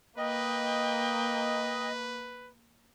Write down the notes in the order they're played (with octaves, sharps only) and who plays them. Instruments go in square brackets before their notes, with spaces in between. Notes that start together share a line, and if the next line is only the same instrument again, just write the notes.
[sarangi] A#3 [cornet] B4 [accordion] D#5 [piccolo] G5